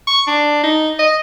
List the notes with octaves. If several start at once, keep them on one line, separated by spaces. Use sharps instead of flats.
C#6
D4
D#4
D#5